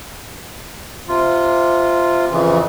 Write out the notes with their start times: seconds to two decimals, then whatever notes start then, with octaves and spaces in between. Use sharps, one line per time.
1.08 C3 F4
2.31 F2 C#3 E3